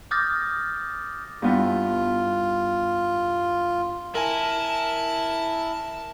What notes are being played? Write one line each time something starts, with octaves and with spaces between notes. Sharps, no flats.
D6 D#6 F6 G6 A6 A#6
G2 B3 E4 F4
E4 A#4 G#5 A5